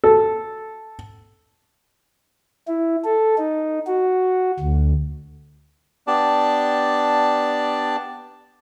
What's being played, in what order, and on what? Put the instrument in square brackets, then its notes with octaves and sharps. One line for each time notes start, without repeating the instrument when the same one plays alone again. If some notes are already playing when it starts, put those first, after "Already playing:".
[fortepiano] A4
[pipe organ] E4
A4
D#4
F#4
D2
[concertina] B3 D4 G4 D5 A5